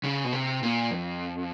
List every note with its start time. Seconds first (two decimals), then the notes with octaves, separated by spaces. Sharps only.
0.04 C#3
0.24 B2
0.33 C3
0.63 A#2
0.91 F2